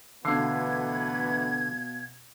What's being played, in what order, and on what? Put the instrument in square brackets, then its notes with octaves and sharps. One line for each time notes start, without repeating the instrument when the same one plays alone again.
[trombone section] D2 E3 B3 [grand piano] B2 F5 C7 [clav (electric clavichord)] D3 [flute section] G#6